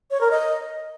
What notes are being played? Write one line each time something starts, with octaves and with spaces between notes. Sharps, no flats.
C#5
A#4
D#5